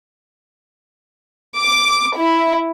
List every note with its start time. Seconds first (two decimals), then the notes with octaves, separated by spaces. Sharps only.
1.59 D6
2.18 E4